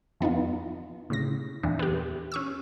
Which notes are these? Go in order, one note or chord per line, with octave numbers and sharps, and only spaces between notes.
F2 B3 D#4 F4
A2 C#3 A#6
E2 A#2 E3 D4
B3 G4
C#4 C#6 E6